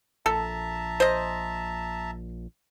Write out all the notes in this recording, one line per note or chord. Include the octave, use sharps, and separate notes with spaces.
A#1 A4 E5 A5 A#5
C5 D#5